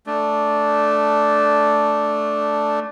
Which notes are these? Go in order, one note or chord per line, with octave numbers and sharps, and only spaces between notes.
A3 D4